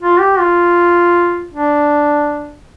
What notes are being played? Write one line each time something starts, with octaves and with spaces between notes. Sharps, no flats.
F4
G4
F4
D4